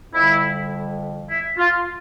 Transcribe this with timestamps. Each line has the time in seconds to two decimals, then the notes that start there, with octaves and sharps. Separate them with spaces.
0.14 F2 D3 G3 E4
1.29 E4
1.58 F4